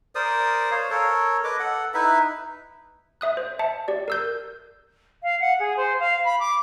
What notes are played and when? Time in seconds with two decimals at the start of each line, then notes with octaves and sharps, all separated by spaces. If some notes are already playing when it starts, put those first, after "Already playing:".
0.15 A#4 C5 D5 D#6
0.71 C5 C#5 F5
0.90 A4 A#4 C#5
1.44 B4 D#5 D6
1.60 A4 F#5
1.94 D#4 E4 B4 E5
3.21 E5 D#6 F#6
3.37 C5
3.59 E5 A5 C#7
3.88 G4 D5
4.08 A#4 E6 G6
5.23 F5
5.40 F#5
5.60 G#4
5.77 C5
6.00 F5
6.24 B5
6.40 D6